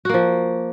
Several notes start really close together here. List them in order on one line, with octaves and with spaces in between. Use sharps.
F#4 A#3 F3